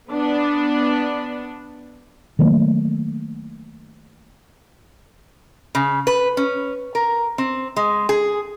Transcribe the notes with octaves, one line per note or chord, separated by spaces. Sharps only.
B3 D4
D#3 F#3 A3 A#3
C#3
B4
C#4
A#4
C4
G#3
G#4